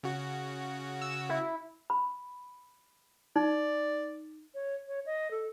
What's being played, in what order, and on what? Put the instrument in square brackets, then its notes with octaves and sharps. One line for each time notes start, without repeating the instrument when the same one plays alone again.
[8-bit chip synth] C#3 F#4
[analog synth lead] E6
E4
[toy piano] B5
[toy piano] D#4 [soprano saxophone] D5
[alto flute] C#5
C#5
D#5
A4